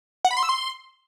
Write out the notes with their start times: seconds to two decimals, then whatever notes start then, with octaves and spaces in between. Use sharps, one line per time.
0.25 F#5
0.31 B5
0.37 C6
0.43 E6
0.49 C6